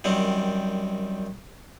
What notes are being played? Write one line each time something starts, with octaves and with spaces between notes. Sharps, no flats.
F#2 D#3 G3 C4